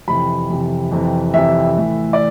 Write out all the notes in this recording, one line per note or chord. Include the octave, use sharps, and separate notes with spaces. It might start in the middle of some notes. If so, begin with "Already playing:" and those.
F2 C3 E3 B5
F2 C3 E3
F2 C3 E3
F2 C3 E3 E5
A2 E3
D5